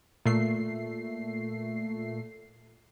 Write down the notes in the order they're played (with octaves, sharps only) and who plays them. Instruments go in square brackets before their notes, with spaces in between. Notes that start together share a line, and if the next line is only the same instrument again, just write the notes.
[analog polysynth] A#2 A3 C7